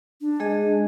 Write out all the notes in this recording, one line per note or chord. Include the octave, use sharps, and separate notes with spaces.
D4
G#3 G#4 D#5